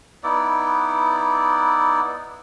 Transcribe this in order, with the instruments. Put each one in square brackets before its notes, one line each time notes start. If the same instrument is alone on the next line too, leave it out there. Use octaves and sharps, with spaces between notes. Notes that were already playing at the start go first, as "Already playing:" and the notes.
[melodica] B3 D#4 E4 D5